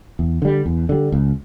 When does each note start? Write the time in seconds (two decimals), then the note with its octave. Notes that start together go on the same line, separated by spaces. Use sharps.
0.19 E2
0.42 D3 G3
0.66 E2
0.89 D3 G3
1.12 C#2